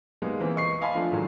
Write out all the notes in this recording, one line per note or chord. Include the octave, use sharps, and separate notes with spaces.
G3 G#3 A#3 B3 D#4
E3 A#3 C4
D#5 C#6 C7
D#5 F5 G#5 A5 B5 C6
F3 A3 D4 F4
A2 D#3 F#3 G#3